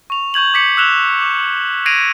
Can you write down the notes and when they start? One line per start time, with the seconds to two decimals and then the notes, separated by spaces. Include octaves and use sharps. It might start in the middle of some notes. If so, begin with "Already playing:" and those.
0.10 C#6 F7
0.34 C#6 G6 G#6 F#7
0.54 D6 B6 C#7
0.77 E6 F#6 E7 F7 G7
1.21 D6
1.86 G#6 A#6 C7 D7 D#7 F7